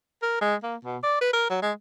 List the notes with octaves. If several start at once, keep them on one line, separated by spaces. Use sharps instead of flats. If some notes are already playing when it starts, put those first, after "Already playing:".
A#4
G#3
A#3
B2
D5
B4
A#4
F#3
G#3